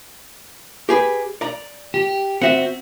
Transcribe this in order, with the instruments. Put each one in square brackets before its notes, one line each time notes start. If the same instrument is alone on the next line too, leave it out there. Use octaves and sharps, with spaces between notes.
[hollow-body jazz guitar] G4 G#4 B4
D5 A#5
[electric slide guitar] G4
[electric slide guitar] C4 F#4 [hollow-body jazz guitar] E5 F#5